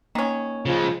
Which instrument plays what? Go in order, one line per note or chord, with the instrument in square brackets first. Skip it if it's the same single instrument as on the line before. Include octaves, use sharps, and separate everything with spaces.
[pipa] D#3 C#4 [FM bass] A#3
[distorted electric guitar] C#3 G#3 [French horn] F3